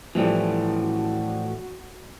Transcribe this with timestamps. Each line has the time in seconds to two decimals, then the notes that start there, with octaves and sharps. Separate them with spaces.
0.15 A2 E3 F3 G3 F#4